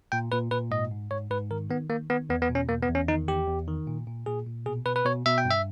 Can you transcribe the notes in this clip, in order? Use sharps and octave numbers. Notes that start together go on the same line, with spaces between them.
A#2 G5
A#2 B4
A#2 B4
G#2 D#5
G#2
G#2 C#5
G#2 B4
D#3 A#4
D#3 B3
D#3 A#3
D#3 B3
E2 B3
B3
B2
C#4
E2 A#3
B3
E2
C#4
D#3 D#4
E2 G4
E2
D#3
A#2
A#2
A#2 G#4
A#2
B2 G#4
B2 B4
B4
B2 C#5
B2 E5
G5
G2
E5